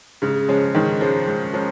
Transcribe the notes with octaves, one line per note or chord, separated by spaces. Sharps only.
G#2 C#3
F3 G#3 C#4
G#2 D#3
F3 G#3 C#4
G#2
F3 G#3 C#4